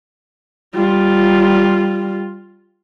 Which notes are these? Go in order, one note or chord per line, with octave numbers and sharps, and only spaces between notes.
G3 F4